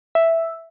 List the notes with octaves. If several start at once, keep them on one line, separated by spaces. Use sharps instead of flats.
E5